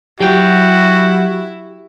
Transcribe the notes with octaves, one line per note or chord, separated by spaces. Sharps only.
F#3 E4 F#4 G4 G5